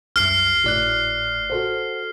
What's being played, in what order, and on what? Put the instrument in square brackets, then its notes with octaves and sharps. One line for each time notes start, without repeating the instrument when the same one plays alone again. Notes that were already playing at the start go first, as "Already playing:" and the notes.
[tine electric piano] C2 F#2 [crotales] F6 C7
[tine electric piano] G#1 D5 F#6 [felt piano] A2
[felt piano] F#4 A4 C5